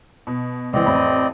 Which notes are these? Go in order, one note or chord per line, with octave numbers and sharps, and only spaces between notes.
B2
C#2 E3 C4 D5 D#5
A1 F2 B5